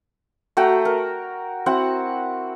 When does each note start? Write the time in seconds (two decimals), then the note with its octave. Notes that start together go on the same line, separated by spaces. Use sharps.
0.57 A3 F#4 G5 A#5
0.85 A#4
1.66 C4 E4 F#4 F#5